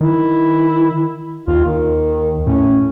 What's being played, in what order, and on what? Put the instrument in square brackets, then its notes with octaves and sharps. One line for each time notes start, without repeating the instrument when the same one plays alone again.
[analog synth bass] D#3 [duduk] E4
[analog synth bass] D#2 [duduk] F4
[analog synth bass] D#2 [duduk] D#3
[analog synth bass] A2 [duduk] C#4